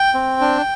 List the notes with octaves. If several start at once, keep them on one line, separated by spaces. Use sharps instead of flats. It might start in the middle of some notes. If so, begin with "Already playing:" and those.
Already playing: G5
C4
D4